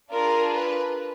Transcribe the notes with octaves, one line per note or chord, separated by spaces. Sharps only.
D4 F4 G#4 A#4
B4